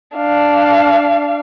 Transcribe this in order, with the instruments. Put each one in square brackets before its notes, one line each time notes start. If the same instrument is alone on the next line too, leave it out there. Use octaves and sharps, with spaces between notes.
[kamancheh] D4 F5